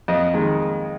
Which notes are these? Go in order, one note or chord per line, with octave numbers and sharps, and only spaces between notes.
F2 D#5
D#3 G#3